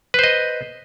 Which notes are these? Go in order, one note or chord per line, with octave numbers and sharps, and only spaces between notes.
B4 C5 D#5